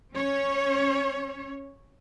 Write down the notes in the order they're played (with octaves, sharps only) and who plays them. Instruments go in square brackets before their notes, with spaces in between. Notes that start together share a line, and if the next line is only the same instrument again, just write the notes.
[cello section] C#4 C#5